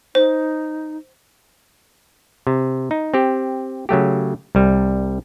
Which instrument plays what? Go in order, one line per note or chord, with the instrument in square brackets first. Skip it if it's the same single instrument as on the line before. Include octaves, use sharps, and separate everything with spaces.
[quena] D#4 [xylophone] C5
[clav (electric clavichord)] C3
D#4
C4 G4
C#3 F#3 A3 G4
C2 G3